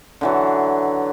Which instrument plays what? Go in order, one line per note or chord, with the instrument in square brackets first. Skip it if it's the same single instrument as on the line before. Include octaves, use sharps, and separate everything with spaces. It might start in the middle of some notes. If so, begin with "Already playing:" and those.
[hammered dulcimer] D3 E3 F#3